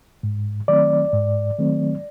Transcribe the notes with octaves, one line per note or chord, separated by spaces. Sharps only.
G#2
D#3 F#3 A3 C4 D5
G#2
D#3 F#3 A3 C4